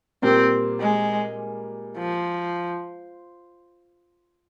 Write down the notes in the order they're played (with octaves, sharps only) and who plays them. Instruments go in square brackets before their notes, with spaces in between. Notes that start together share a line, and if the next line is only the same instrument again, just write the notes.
[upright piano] A#2 G3 A#3 [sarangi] C4
[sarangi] G#3
F3